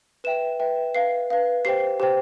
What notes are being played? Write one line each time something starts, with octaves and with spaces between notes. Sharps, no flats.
B4 E5 G5 E7
B4 E5 G5
B4 F5 C7
B4 F5
G4 C5 G5 C7
G4 C5 G5